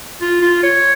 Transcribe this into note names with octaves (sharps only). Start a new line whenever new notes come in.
F4
F4
C#5